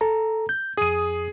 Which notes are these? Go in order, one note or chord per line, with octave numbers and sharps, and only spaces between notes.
A4 A#5
G6
F2 G#4 D#6 D#7